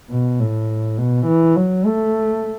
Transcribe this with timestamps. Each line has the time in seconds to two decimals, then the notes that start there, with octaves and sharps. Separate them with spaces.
0.10 B2
0.40 A2
0.98 B2
1.27 E3
1.56 F#3
1.86 A3